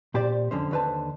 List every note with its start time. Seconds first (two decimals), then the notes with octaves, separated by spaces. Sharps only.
0.14 A#2 G4 C5 D5
0.51 F2 D3 C#4 C5
0.71 D#2 D3 B4 C5 A5